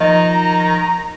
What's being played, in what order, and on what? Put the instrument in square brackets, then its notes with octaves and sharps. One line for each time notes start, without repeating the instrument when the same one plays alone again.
[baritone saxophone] D#3 [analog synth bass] F3 [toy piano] D#5 [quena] A#5